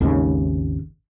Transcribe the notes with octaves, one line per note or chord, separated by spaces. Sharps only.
G#1 D#2 G#2 C#3